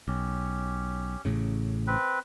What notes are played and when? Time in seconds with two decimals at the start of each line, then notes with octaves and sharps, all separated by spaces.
0.08 B1 C#4 G4
1.25 A1 A2 C#3
1.87 C4 B4